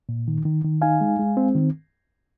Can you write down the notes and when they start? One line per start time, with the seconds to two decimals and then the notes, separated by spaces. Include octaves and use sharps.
0.09 A#2
0.28 D#3
0.45 D#3
0.64 D#3
0.82 D#4 F5 G#5
1.01 G#3
1.19 G#3
1.37 C4
1.55 D#3